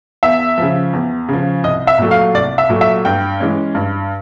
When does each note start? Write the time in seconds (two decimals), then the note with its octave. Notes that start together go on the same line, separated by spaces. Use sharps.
0.23 E2 E5
0.58 C#3 F3
0.93 E2
1.29 C#3 F3
1.64 C2 D#5
1.87 E5
1.98 A#2 F#3 A3
2.11 F5
2.34 C2 D5
2.58 E5
2.69 A#2 F#3 A3
2.81 E5
3.05 G2 G5
3.40 E3 G#3 C#4
3.75 G2